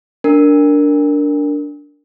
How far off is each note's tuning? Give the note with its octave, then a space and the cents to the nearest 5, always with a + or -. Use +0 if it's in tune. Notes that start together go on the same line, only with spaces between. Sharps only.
D4 -10 A#4 -5